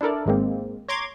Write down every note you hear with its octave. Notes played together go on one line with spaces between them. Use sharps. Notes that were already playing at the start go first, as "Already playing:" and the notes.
D4 E4 A4 A#4 D5
G#1 G#2 G#3 A#3 C4
C#5 A#5 C6 D6 G#6